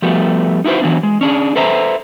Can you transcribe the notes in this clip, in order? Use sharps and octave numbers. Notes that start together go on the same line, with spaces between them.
F3 G3 A3 B3 F#4
D#4 E4 F#4 B4 C5
E3 F#3 B3 D4
G#3
C#4 D4 G#4
A4 B4 C5 E5 A#5